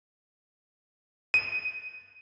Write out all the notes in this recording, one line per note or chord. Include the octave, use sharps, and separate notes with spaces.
D#7